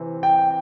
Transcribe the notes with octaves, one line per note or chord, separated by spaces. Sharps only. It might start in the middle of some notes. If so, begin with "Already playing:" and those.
Already playing: C3 E3 C4
G5